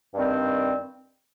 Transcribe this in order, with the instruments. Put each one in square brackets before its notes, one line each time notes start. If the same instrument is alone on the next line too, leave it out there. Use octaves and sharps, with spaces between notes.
[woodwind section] G2 D#3 G3 C4